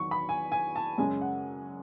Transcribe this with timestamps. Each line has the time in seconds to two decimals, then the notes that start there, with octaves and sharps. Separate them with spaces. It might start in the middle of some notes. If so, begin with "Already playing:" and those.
Already playing: E2 D#3 F#3 B3 C#6
0.11 B5
0.29 G#5
0.52 G#5
0.76 A5
0.98 F#2 C#3 G#3 C#4 G#5
1.21 F#5